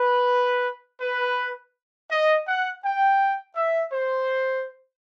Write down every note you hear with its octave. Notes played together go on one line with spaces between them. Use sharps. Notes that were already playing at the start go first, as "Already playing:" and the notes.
Already playing: B4
B4
D#5
F#5
G5
E5
C5